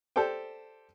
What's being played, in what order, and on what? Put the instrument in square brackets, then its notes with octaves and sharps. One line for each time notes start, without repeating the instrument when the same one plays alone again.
[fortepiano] G4 A4 C5 D5 G5